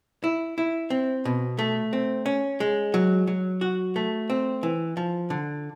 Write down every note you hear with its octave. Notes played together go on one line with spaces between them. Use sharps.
E4
E4
C4
B2
A3
C4
C#4
G#3
F#3
F#3
F#4
A3
C4
E3
F3
D3